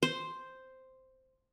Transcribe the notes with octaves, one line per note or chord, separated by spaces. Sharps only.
C5